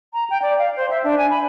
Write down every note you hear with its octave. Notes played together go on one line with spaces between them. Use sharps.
A#5
G5
D5
F5
C5
E5
D4
G#5
B5